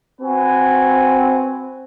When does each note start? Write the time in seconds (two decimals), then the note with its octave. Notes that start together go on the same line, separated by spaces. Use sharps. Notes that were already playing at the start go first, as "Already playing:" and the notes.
0.21 C4 F#4 B4 G#5